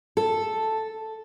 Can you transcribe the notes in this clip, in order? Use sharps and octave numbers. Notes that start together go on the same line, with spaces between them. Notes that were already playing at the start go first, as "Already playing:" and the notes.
A4